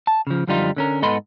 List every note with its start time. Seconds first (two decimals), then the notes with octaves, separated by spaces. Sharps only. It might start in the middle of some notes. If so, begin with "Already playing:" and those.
0.07 A5
0.27 C#3 F3
0.47 F#2 D3 F3 G3 D#4 F4
0.77 D3 C#4 A#4
1.02 G#2 B3 A4 D#5 B5 C6